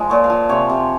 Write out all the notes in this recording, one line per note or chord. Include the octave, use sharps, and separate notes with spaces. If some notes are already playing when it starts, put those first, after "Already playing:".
Already playing: F3 G#3
A#2 C#5
F5
F3
C3 C#5
C3